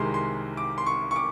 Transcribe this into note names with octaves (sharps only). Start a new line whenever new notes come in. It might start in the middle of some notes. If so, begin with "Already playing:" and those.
Already playing: C2 C3 D#3 G#3 C6
C6
D6
C6
C#6
C#6
D6